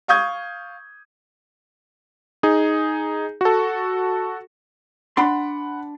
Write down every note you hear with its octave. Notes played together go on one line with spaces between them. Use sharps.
F5 C#6 D#6 G6 G#6
D#4 G#4
F#4 A4
D4 F#5 B5 C6